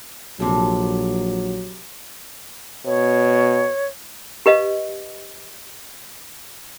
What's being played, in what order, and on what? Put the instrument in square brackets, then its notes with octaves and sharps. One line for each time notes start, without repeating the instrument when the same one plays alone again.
[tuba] A#1 [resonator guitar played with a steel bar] C3 A4 [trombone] F#3
[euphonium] B2 [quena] C#5
[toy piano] G4 B4 D#5 F5